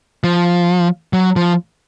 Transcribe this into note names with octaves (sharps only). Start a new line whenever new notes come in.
F3
F#3
F3